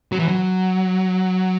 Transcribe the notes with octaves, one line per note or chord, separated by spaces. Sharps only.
F#3
E3
F#3